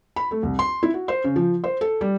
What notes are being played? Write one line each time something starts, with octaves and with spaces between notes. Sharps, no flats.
B5
A3
C2
C6
E4
F#4
C5
C#3
F3
C5
A4
G3